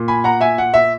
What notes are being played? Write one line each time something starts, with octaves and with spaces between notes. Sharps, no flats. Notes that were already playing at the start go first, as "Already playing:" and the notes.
Already playing: A#2
G#5 B5
F#5 A#5
E5 G#5
F#5
E5